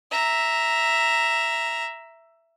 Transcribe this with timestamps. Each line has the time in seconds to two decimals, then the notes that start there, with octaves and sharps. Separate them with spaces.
0.11 E5 A#5